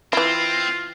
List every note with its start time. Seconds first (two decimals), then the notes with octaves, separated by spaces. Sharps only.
0.13 E3 C4 E4 F4